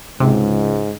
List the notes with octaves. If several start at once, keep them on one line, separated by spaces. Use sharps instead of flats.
C#2 G#2 C3